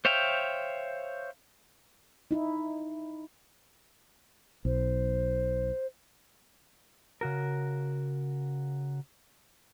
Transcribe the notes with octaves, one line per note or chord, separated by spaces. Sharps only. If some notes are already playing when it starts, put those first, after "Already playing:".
C5 C#5 E5 F5 G5
D#4 E4
B1 C5
C#3 F#4 A#4